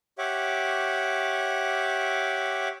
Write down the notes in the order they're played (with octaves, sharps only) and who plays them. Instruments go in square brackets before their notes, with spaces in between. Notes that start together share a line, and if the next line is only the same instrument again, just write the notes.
[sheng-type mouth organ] G4 C#5 E5 F#5 D6